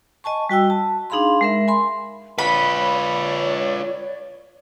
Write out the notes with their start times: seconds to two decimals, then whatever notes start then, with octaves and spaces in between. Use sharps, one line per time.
0.24 D#5 G#5 A5 C#6
0.49 G3 F#4 G5 E6
0.70 A5
1.10 D4 D#4 G#4 F5 B5 C6
1.41 G#3 A#4 E5
1.68 G#5 B5 C6
2.38 F4 B4 C#5 D5 B5